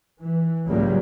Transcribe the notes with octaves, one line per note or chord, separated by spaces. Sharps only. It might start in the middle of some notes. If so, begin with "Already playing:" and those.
E3
C#2 G#2 F#3 G3 A#3